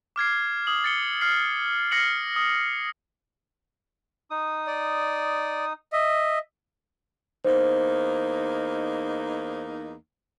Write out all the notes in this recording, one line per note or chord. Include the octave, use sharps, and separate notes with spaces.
D6 F6 G#6 C7
D#6 F#7
A6 C#7 G7
F6 C7
F6 A#6 C7 C#7 F#7
D#6
D#4 D#6
D5
D#5 E5
E2 A#3 D#4 C5